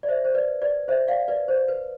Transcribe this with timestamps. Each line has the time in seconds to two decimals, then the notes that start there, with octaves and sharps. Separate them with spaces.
0.03 D5
0.08 C5 E5
0.24 C5
0.34 B4 D5
0.62 B4 D5
0.88 C5 E5
1.08 D5 F5
1.28 B4 D5
1.48 C5
1.68 B4